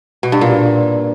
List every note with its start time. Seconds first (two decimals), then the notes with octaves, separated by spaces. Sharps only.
0.23 B2
0.32 G2
0.41 A#2